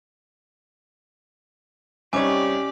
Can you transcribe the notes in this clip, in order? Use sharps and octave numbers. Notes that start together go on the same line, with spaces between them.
C2 C#4 D#4 G4 C#5 D5 G#5 D6